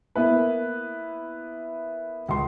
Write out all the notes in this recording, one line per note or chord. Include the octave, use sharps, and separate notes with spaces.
A#3 B3 E4 B4
C#2 C6